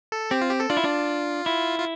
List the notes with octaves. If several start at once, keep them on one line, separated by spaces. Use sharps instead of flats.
A4
C4 G4
F4
G4
A4
D4 F4
E4
D4
E4
F4